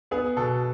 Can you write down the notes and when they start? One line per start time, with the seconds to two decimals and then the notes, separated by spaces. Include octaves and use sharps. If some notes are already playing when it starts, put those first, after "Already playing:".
0.11 B3 G#4
0.36 B2 A4